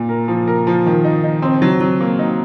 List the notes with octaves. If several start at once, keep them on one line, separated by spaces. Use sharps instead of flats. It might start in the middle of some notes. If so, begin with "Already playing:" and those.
Already playing: A#2
A#4
F3
A#4
F3
D#3
D#4
D#4
C4
F#3
F#3
A#3
D#4